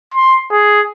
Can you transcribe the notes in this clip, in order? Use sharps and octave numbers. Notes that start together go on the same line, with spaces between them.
C6
G#4